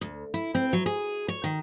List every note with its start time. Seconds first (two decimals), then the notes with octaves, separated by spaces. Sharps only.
0.01 D2
0.34 E4
0.55 C4
0.73 F#3
0.86 G#4
1.28 C#5
1.44 D#3